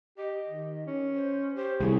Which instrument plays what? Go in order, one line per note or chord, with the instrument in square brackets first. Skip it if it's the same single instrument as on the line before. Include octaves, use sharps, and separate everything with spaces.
[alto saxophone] G4 [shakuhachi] D#5
[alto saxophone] D#3
C#4
[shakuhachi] C5
[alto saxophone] G4 [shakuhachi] C5
[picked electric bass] C2 [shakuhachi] G#4